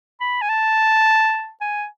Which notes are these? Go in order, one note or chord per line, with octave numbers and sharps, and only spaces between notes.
B5
G#5
A5
G#5